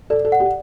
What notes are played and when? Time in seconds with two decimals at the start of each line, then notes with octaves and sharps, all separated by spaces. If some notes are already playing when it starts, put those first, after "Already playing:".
0.10 A4 D5
0.25 A4
0.32 F#5
0.40 G4